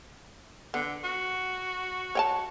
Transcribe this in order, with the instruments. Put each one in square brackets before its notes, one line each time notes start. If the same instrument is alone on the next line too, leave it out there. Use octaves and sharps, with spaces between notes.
[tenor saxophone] D3 [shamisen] B3
[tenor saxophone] F#4
[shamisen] C#5 G5 A5